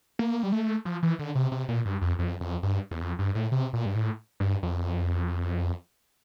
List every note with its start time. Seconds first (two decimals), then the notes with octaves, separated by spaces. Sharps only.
0.19 A#3
0.43 G3
0.52 A3
0.85 F3
1.03 E3
1.19 D3
1.35 C3
1.52 C3
1.68 A#2
1.85 G2
2.01 F2
2.19 F2
2.41 F2
2.63 G2
2.91 E2
3.02 F2
3.19 G2
3.35 A2
3.52 C3
3.73 A#2
3.86 G2
3.95 A2
4.40 G2
4.63 F2